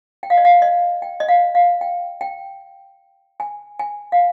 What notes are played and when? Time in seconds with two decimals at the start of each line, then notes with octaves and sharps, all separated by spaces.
0.23 G5
0.30 F5
0.37 D#5
0.45 F5
0.62 D#5
1.02 G5
1.20 D#5
1.29 F5
1.55 F5
1.81 G5
2.21 G5
3.40 G#5
3.79 G#5
4.12 F5